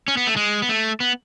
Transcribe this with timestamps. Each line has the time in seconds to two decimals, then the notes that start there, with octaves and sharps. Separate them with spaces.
0.08 C#4
0.17 B3
0.27 A3
0.36 G#3
0.62 B3
0.69 A3
1.00 B3